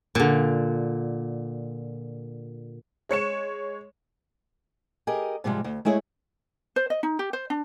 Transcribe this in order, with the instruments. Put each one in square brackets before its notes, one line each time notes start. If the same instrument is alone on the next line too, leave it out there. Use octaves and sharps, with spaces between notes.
[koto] A#2 D3
[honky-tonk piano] G#3 C#5 C#7 E7
[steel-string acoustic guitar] G4 G#4 A#4 D#5
G#2 C3 F3 G3 G#3
D2
G#3 A3 E4 G#4 C#5
[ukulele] C5
D#5
D#4
G4
C5
D4